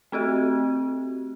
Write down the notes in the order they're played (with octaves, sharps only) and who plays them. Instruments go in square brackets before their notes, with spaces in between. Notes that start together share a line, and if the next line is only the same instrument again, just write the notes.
[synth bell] A3 C4 F#4 G4